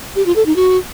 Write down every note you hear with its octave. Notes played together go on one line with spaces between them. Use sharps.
G4
F4
A4
D#4
F#4